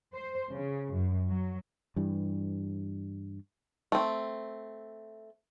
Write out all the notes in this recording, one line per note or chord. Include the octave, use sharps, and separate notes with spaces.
C5
C#3
F#2
F#3
G2 E3 G3
A3 C4